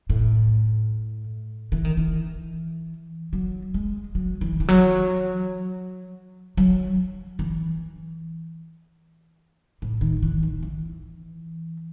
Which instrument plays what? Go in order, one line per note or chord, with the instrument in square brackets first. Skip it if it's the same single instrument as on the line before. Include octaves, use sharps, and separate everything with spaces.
[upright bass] A2
E3
D#3
E3
F#3
G#3
F#3
E3
E3
F#3
F#3
E3
A2
D#3
E3
D#3
E3